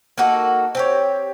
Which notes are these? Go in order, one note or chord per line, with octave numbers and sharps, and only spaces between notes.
A#3 D#4 F#4 A4
C4 G4 C#5